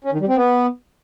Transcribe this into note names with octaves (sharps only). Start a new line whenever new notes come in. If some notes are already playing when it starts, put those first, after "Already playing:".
C#4
D#3
G3
C4
B3